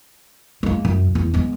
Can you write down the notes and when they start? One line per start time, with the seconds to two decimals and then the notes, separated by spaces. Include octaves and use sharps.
0.63 G#3 A#3
0.85 F#2
1.15 E2
1.34 G#3 B3